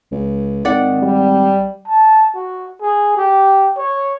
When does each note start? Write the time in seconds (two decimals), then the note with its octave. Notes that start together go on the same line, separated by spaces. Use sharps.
0.12 C#2
0.65 G#1 D#3 D5 F#5
1.03 G3
1.88 A5
2.35 F#4
2.81 G#4
3.17 G4
3.77 C#5